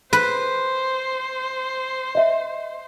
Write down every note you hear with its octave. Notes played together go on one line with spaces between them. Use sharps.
B4 C5
D#5 E5